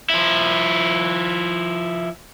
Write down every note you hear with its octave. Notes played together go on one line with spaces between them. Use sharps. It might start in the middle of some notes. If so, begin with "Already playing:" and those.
F3 E4